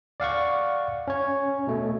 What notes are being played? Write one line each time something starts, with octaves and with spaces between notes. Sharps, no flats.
D5 F5 F#5 C#6
C#4 C#5
B2 A3